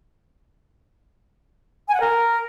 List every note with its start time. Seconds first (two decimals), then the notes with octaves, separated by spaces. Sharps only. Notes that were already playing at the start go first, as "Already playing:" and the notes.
1.88 G#5
1.94 F#5
2.01 A#4